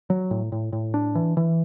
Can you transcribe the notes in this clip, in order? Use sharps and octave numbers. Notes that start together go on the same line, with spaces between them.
F#3
A2
A2
A2
D4
E3
E3